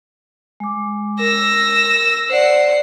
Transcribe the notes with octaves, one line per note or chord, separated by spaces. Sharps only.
G#3 D6
A#4 E6 A#6
C5 D5 F#5 C7